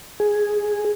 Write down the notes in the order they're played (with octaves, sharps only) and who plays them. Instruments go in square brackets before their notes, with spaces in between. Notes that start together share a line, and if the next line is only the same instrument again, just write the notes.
[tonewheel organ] G#4